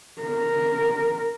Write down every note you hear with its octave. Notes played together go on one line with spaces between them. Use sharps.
A#4